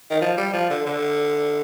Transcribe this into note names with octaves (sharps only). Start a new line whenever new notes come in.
D#3
F3
G3
F3
D3
D3